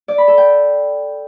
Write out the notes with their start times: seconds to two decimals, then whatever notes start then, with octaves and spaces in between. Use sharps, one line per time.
0.08 D5
0.18 B5
0.28 A4
0.38 G5